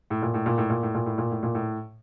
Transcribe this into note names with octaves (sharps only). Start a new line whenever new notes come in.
A2
A#2
A2
A#2
A2
A#2
A2
A#2
A2
A#2
A2
A#2
A2